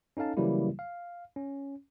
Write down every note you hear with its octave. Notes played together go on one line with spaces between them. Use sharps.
C#4 D#4 A4 F5 A5
C#3 E3 F#3 G3 A#3 E4
F5
C#4